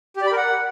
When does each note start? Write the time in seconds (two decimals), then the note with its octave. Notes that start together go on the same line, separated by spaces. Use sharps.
0.16 G4
0.22 D5
0.27 B5
0.32 A#4
0.37 F#5